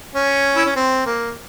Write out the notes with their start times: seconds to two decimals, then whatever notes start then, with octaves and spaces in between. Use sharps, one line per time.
0.15 C#4
0.56 E4
0.66 C#4
0.76 C4
1.06 A#3